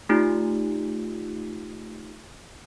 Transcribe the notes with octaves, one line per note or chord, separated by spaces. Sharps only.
A3 D#4 F4 G4